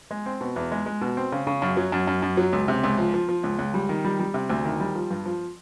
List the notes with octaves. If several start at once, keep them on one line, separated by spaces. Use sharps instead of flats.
G#3
C4
B2
E2
G#3
G#3
B2
C4
C#3
C#3
F#2
F#3
F#2
F#2
F#2
F#3
C#2
C3
C#2
F3
F3
F3
C#2
C#2
G3
D#3
G3
G3
C3
D2
D#3
G3
F3
G2
F3